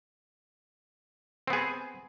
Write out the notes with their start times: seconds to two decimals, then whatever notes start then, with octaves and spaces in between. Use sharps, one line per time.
1.47 C4
1.50 B3
1.53 G#4